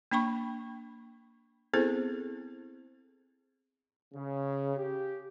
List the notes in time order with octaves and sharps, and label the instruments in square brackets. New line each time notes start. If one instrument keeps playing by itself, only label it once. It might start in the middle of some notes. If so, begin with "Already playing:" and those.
[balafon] A#3 D4 G5 B5 C#6
B3 C4 E4 G#4 A4 C5
[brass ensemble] C#3
G4